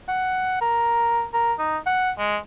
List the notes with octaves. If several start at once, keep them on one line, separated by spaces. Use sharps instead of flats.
F#5
A#4
A#4
D#4
F#5
G#3